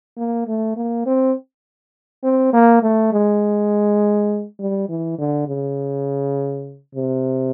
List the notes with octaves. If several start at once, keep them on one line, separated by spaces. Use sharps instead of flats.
A#3
A3
A#3
C4
C4
A#3
A3
G#3
G3
E3
D3
C#3
C3